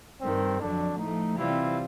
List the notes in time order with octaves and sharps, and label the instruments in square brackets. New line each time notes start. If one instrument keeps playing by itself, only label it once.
[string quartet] G2 D#3 G3 [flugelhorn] C4
[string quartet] F2 D3 F#3 [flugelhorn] D4
[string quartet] A2 F3 A3 [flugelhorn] D#4
[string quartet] C3 E3 G3 C4 F4 [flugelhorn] E4